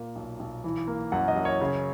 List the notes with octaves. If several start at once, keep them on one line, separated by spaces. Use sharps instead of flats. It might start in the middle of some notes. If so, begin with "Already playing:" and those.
Already playing: A#2 A#3
B1
B1
E3
A#3
F#2 F#5
D#5
F#2
C#5
C#3